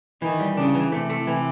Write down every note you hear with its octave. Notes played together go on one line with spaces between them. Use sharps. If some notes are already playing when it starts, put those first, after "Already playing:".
D#3 E3
G3
C#3 D4
E3
C3 A3
A3
E3